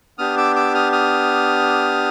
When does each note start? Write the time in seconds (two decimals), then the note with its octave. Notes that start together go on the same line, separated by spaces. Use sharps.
0.18 B3 D4 G4 D#6 F6
0.37 D6 E6
0.56 D6 E6
0.75 D#6 F6
0.92 D#6 F6